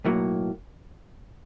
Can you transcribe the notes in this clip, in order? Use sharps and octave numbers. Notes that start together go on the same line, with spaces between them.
B1 A2 F#3 A#3